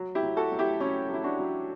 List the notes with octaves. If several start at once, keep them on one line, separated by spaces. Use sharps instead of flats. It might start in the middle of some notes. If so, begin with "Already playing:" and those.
Already playing: F#3
E4 G4
F#3
F#4 A4
F#3
E4 G4
F#3 C#4 E4
F#3 E4
D4 F#4
F#3